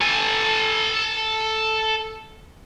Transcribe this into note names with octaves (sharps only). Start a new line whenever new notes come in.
A4 G#5